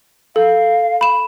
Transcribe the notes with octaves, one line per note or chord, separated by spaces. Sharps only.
A4 F5
B5 E7